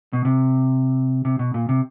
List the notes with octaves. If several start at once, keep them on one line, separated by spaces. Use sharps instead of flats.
B2
C3
C3
B2
A#2
C3